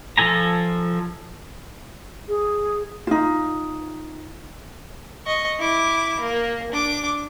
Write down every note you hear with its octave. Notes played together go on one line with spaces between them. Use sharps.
F3 A4 G#5 A#5
G#4
D#4 F4
D#5 C#6
E4 D6
A#3
D4 D6